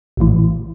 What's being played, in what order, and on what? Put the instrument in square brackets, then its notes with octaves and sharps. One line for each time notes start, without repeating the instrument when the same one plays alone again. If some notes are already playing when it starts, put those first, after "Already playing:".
[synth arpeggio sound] A#1 A2 E3